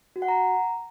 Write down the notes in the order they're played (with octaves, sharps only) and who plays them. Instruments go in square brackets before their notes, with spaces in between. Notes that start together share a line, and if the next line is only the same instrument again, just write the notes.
[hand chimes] F#4
F#5
A#5